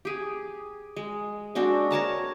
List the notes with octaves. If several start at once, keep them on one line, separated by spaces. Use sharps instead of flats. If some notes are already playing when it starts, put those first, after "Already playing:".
G4 G#4
G#3
G#3 C4 D4 F#4
A#4 C#5 A5 A#5